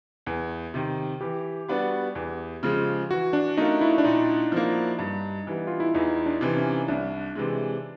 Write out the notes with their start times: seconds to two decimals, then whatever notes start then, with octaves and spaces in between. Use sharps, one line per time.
0.26 E2
0.74 C3 D#3
1.21 E3 G4
1.68 G3 B3 D4 F#4
2.15 E2
2.63 C#3 F3 G#3
3.10 E3 F#4
3.33 D4
3.57 A3 C#4 D#4 F4 A#4
3.81 E4
3.98 D4
4.04 A#2 D#4
4.52 F3 A#3
4.99 G2
5.47 E3 G3 B3
5.67 F4
5.80 E4
5.94 E2 D#4
6.26 D4
6.41 C3 E3
6.57 C#4
6.88 C2 D4
7.35 C3 E3 G#3